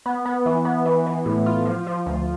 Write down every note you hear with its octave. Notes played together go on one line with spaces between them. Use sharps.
B3
B3
E3
B3
E3
E3
A2
F4
F3
F3
D2